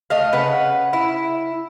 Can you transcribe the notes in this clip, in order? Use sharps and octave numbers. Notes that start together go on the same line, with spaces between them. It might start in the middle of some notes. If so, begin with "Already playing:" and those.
A3 D#5 F5
C#3 B4 F#5
E4